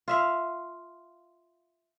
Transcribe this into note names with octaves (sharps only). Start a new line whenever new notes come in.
F4 E5 F5